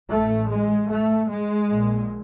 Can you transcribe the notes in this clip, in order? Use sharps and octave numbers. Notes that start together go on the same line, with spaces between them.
A1 A2 A3
G#3
A3
G#3
A#1 A#2